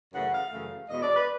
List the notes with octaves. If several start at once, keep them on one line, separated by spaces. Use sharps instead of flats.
F#2 C#3 E3 A3 F#5
F5
F#2 C#3 E3 A3
E2 B2 G#3 D#5
D5
B4